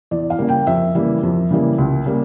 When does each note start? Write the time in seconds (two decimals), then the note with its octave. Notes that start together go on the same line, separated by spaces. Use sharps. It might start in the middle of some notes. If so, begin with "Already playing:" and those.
0.11 E2 D5
0.30 F5
0.39 C#3 G3 A#3
0.49 G5
0.67 F2 E5
0.95 C#3 E3 G3 A#3
1.23 F2
1.51 C#3 E3 G3 A#3
1.78 C#2
2.06 C#3 G3 A#3